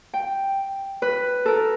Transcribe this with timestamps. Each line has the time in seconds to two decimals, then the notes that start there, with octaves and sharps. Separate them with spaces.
0.14 G5
1.02 B4
1.45 A4 A#4